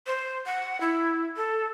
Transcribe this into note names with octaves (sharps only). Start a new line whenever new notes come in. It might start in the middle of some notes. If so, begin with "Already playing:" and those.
C5
F#5
E4
A4